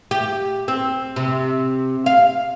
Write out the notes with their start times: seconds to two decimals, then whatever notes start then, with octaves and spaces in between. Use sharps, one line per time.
0.11 G4
0.68 C4
1.16 C3
2.06 F5